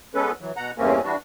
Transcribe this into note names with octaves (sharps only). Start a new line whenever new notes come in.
G#3 B3 C#4 A4 B4
E3 F#3
B2 F#5 A#5
E2 G2 C3 A#3 C4 C#4
E3 G3 D4 F#4